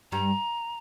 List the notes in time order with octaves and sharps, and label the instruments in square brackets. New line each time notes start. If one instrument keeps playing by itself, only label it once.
[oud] G2 G3 [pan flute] A#5